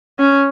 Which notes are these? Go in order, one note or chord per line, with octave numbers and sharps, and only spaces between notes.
C#4